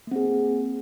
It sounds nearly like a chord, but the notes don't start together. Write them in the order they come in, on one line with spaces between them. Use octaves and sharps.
A#3 C4 G#4